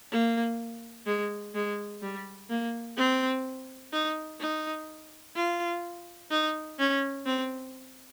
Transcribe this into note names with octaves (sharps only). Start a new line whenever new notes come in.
A#3
G#3
G#3
G3
A#3
C4
D#4
D#4
F4
D#4
C#4
C4